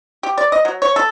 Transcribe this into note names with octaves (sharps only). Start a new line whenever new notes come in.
G4
D5
D#5
F#3
C#5
A4